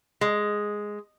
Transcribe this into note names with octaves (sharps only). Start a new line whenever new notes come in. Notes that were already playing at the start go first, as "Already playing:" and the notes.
G#3